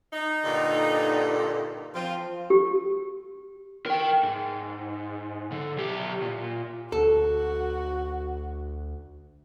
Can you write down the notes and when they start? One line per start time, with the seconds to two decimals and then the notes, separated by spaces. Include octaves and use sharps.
0.13 D#4
0.44 G2 A#2 D3
1.95 F3 C4 F4
2.50 G4
3.86 A#4 G5
4.23 G#2
5.52 D3
5.78 B1 G4
6.22 A#2
6.92 D2 F#4 A4